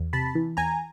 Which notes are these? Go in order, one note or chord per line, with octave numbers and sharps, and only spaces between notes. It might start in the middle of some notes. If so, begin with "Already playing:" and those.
Already playing: E2
C3 A5 B5
E3
E2 G#5 A#5